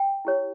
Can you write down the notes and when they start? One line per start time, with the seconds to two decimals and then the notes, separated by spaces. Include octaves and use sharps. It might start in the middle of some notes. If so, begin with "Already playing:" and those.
Already playing: G5
0.25 E4 G4 C#5